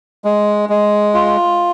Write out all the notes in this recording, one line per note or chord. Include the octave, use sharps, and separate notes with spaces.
G#3
G#3
F4